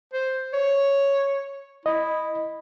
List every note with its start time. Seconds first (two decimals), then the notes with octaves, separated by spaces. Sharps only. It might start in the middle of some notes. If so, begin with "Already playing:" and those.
0.13 C5
0.54 C#5
1.86 E4 D#5